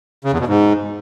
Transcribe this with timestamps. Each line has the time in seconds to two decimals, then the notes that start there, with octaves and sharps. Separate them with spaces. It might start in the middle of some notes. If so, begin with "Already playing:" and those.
0.25 C#3
0.32 E2
0.40 B2
0.47 G#2